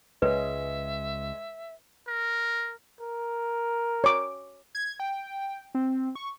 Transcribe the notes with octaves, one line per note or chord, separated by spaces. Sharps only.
C#2 G#3 B4 C#5 D#5 E5
A#4
A#4
C#5 D6
G#6
G5
C4
C#6